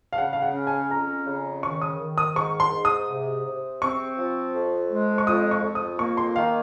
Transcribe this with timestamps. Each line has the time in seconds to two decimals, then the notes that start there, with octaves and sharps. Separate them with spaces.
0.13 F5
0.18 C#3 F#5
0.33 F5
0.42 F#5
0.54 C#4
0.67 G#5
0.91 F2 A#5
1.26 C#3
1.63 D#3 C#6
1.82 D#6
2.00 D#3
2.18 D#6
2.35 G#2 C#6
2.60 C6
2.72 G#2
2.85 D#6
3.09 C3
3.45 C3
3.82 C4 C#6
4.17 F3
4.55 F2
4.90 G#3
5.18 C#6
5.27 F2 D#6
5.51 C#6
5.63 F2
5.75 D#6
5.99 A#3 C#6
6.17 C6
6.36 D#3 F5